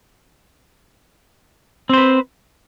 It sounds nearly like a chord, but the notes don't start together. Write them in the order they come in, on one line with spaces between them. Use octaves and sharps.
C4 C5 B4